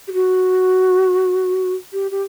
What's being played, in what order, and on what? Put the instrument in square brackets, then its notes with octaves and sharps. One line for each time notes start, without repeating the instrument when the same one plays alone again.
[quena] G4
F#4
G4
G4